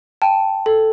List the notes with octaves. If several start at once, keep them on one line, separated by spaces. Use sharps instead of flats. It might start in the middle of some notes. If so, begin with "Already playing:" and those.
G5 A5
A4